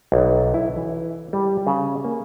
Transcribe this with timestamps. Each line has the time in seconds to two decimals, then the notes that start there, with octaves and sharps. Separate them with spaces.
0.12 B1
0.54 E4
0.76 E3
1.33 G3
1.67 C#3
2.04 A#3